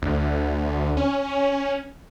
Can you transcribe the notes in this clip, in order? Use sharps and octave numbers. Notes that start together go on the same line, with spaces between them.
D2
C#4